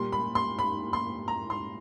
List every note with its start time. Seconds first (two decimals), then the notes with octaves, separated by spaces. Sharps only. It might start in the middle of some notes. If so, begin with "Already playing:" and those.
Already playing: A#2 G3 A#3 C6
0.12 B5
0.35 C6
0.59 B5
0.93 C6
1.28 A#5
1.50 C6